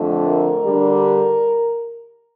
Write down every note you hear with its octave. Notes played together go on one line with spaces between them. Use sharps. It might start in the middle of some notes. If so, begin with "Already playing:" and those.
Already playing: F2 D3 A3 D4
A#4
D3 G3 D4